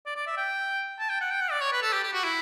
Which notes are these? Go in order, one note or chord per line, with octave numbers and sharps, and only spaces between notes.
D5
D5
E5
G5
A5
G5
F#5
G5
F#5
D5
C#5
B4
A4
G4
G4
F#4
E4